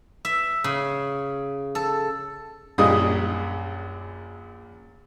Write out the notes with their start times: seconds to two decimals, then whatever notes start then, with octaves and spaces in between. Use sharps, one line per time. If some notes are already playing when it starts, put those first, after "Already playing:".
0.25 E5
0.64 C#3
1.75 A4
2.78 A#1 F#2 G3 G#4 D#5 D#6